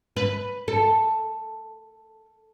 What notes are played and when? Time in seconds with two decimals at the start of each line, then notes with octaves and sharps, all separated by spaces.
0.16 B4
0.68 A4